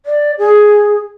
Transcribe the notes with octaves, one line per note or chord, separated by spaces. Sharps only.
D5
G#4